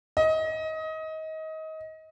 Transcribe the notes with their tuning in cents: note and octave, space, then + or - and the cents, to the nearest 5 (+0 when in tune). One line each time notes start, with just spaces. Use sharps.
D#5 +25